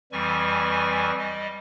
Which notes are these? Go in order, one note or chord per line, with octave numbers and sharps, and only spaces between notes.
F2 E3 G3 G#5 C#6
G3 D#5